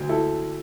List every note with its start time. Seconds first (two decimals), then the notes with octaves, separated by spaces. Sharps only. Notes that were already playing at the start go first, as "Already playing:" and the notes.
Already playing: D2
0.09 E4 A4